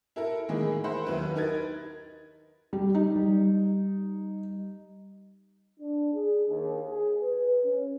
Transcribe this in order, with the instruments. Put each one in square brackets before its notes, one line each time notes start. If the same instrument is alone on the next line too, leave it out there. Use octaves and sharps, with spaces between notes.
[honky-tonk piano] E4 A4 A#4
A2 D#3 E3 G#3 A#3 D#4
A#4 C5 E5 F#5 B5
D#2 F#3 E4 B4
D#4 A#4 B4 G#6 A6
[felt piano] G3
D#4
[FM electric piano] G3
[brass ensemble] D4
G#4
D#2
G#4
B4
C#4